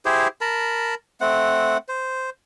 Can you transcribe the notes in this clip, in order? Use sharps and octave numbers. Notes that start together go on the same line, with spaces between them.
E4 G4 G#4 C5
A#4 A5 B5
A3 C4 F#5
C5